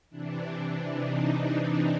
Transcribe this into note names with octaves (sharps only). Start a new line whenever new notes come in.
C3 E3 D4
D#4